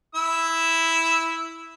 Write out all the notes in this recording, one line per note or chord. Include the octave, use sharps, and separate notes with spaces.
E4 E6